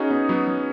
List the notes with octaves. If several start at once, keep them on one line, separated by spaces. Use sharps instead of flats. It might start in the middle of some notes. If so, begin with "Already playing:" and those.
Already playing: C#4 D#4 F#4 G#4
B3 D#4
F#3 B3
F#3